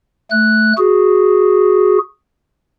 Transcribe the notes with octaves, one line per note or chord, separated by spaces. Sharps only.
A3 F#6
F#4 G#4